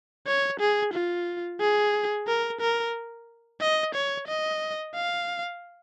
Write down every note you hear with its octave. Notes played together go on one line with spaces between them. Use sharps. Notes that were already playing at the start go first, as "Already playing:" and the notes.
C#5
G#4
F4
G#4
A#4
A#4
D#5
C#5
D#5
F5